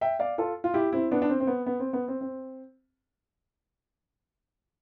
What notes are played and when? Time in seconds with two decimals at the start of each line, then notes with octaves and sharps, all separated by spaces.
0.01 E5 G5
0.19 D5 F5
0.38 F4 A4
0.64 F4
0.74 E4 G4
0.93 C4 E4
1.11 B3 D4
1.22 D4
1.30 C4
1.40 C4
1.47 B3
1.66 B3
1.80 C4
1.93 B3
2.08 C4
2.21 C4